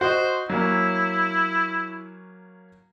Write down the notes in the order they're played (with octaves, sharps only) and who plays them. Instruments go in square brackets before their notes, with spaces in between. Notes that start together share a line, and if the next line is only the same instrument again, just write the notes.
[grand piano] F#4 D#5 [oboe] C5
[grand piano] F#3 A#3 C#4 [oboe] E4